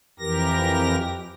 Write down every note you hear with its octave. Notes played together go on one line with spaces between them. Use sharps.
F2 E3 G4 A#4 A#6